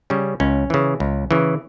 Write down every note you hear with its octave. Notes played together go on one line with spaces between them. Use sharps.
C#3 G3 C#4
C#2 C#4
C#3 E3
C#2
C#3 E3